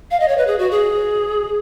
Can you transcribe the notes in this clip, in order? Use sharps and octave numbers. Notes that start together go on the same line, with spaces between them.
F5
D#5
C#5
B4
G#4
F#4
G#4